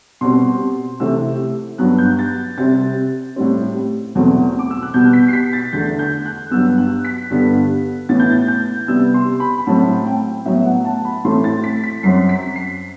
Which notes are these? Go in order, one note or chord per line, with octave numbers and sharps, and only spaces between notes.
B2 G3 C4 C6
C3 E3 A3 C4 E6
G2 F#3 B3 F#6
G6
A6
C3 G3 C4 A6
A2 G3 C4
E2 B2 F#3 A3 C4
D6
E6
F#6
B2 G3 B3 G6
B6
C7
B6
A6
E2 D3 A3 G6
G6
F#6
G2 F#3 B3 E6
F#6
B6
G2 D3 G3 B3
A2 E3 B3 A6
G6
A6
G6
C3 G3 B3 E6
C6
B5
B5
A2 F#3 C4 A5
G5
A2 F#3 B3 E5
F#5
A5
B5
A2 E3 A3 C4 C6
A6
B6
B6
F#2 F#3 C4 C7
B6
C7